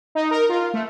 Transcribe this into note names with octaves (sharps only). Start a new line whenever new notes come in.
D#4
A#4
F4
A3